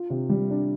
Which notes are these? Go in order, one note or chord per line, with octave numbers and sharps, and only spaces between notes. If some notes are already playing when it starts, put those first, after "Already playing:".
Already playing: F4
C3
G3
D4